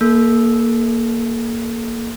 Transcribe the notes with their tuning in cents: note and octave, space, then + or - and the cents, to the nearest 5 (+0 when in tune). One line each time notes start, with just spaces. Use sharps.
A#3 +0 A4 -35